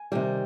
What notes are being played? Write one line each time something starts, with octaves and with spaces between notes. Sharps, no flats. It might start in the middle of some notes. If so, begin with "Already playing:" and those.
Already playing: G#5
C3 D#3 G3